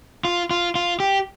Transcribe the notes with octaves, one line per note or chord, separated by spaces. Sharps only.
F4
F4
F4
G4